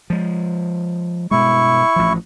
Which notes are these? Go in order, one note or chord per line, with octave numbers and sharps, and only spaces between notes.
F3 G#3
G2 B2 G#3 E4 C#6
A1 F3